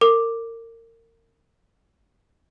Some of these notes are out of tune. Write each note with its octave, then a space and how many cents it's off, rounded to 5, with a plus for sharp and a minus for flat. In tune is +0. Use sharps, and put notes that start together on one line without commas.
A#4 -30 D6 +0